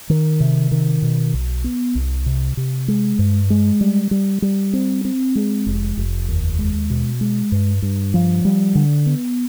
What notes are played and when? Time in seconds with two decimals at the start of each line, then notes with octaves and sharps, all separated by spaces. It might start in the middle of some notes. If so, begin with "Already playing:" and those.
0.10 D#3
0.40 C3
0.71 D#3
1.02 B2
1.34 B1
1.64 B3
1.95 C2
2.26 C3
2.57 C3
2.88 G#3
3.19 G2
3.50 G#3
3.81 G3
4.11 G3
4.42 G3
4.73 C4
5.05 C4
5.35 G#3
5.66 F1
5.97 F1
6.28 D#2
6.59 G#3
6.90 B2
7.21 G#3
7.52 G2
7.82 G2
8.14 F3
8.45 G3
8.75 D3
9.06 B3